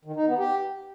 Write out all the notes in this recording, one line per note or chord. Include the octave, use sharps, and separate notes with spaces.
D#3
D#4
B3
G4